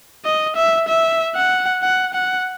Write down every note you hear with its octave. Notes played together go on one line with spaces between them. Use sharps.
D#5
E5
E5
F#5
F#5
F#5